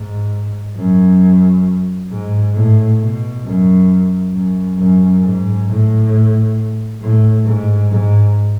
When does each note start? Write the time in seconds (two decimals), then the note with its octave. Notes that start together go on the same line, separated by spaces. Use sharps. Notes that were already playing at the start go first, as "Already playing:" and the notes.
Already playing: G#2
0.76 F#2
2.10 G#2
2.55 A2
3.00 B2
3.45 F#2
4.33 F#2
4.78 F#2
5.23 G#2
5.67 A2
7.01 A2
7.45 G#2
7.90 G#2